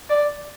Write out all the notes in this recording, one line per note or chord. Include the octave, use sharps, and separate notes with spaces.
D5